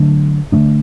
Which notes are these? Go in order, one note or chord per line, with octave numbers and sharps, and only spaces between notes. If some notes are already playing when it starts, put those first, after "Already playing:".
Already playing: D3 F#3 A3 D4
D3 F#3 A3 D4